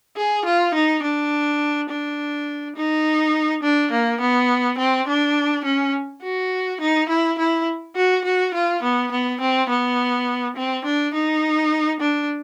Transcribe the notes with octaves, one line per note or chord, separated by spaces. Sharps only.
G#4
F4
D#4
D4
D4
D#4
D4
A#3
B3
C4
D4
C#4
F#4
D#4
E4
E4
F#4
F#4
F4
B3
B3
C4
B3
C4
D4
D#4
D4